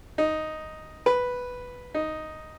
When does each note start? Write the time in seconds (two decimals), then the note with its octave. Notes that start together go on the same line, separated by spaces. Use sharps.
0.18 D#4
1.06 B4
1.94 D#4